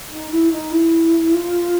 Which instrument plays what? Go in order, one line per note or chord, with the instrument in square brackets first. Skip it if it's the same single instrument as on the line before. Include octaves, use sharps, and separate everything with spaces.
[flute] D#4
E4
D#4
E4
F4